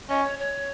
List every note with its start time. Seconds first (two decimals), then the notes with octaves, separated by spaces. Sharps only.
0.09 C#4 D#5
0.24 C#5
0.39 C#5